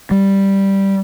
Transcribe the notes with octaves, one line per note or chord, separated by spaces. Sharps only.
G3